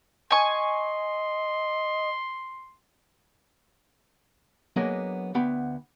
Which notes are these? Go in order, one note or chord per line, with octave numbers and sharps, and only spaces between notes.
D#5 G#5 C6 C#6
F#3 A#3 B3 D4 G#4 D#5
D2 B3 G5 B5